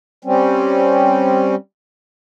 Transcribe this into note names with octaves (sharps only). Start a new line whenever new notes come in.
G3 C4 C#4